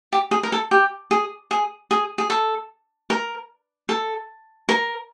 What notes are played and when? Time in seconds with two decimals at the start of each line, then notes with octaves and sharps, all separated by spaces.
0.13 G4
0.31 G#4
0.43 A#4
0.52 A4
0.71 G4
1.11 G#4
1.51 G#4
1.91 G#4
2.18 G#4
2.30 A4
3.10 A#4
3.89 A4
4.69 A#4